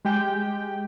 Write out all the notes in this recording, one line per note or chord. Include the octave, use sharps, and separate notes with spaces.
G#3 G4 G5